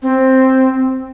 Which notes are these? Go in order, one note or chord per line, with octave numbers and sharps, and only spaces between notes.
C4